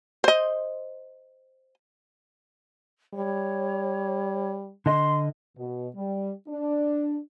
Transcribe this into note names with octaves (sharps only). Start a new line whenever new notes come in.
C5 D#5
G3 C#5
D3 D#5 C6
B2
G3
D4